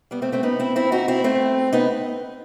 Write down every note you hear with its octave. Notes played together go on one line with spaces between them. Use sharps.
G3 B3
A3 C4
A3 C4
B3 D#4
C4 E4
C4 E4
D#4 F#4
C4 E4
A3 C4
B3 D#4